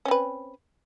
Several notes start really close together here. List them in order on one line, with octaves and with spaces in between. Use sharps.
C#4 C4 B4